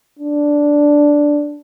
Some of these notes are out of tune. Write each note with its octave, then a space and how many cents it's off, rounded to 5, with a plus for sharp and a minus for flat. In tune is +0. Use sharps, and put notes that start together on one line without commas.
D4 -5